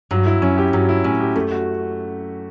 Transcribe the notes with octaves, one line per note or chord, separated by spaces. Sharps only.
G2 F#3
E4
F#2 C#4
G4
G2 F#3
E4
A2 C#4
G4
F#2 A3
F#4